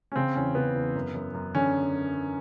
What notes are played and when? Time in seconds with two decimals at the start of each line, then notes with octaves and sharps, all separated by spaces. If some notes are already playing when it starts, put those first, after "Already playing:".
0.12 C#4
0.16 C#3 C4
0.36 E2 C#4
0.55 C#3 B3
0.75 E2
0.95 F#2
1.14 F#2
1.34 F#2
1.55 D3 C#4